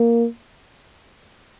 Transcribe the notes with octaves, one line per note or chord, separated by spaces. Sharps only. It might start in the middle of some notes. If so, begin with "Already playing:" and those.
Already playing: A#3